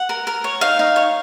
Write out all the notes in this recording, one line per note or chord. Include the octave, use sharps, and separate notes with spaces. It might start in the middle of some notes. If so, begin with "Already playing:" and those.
Already playing: F#5
A#4
A#4
C#5
D#4 F5
D#4
C#5